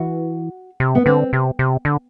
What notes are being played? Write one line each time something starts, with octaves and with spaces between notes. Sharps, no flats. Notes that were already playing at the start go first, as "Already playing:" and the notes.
Already playing: E3 F#4
C3
B3
D3 C4
C3
C3
D3